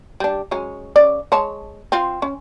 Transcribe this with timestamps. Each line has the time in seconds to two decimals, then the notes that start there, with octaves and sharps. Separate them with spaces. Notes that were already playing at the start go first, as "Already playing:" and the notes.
0.20 G3 D4
0.51 F#3 G#3 C#4
0.96 C#3 C#4 D5
1.32 G#3 C#5 A5
1.92 C4 F4
2.22 C#4